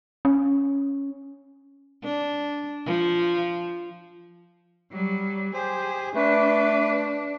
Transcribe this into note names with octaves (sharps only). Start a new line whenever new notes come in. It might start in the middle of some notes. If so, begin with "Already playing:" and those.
C#4
D4
F3
F#3 G3
G4 G#4 C5
A3 D4 B4